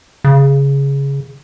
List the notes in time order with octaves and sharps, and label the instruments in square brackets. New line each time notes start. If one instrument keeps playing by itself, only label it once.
[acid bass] C#3